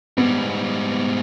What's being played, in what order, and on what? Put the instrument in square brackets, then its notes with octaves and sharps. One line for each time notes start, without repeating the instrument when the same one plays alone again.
[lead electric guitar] G#2 G3 [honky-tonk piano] B3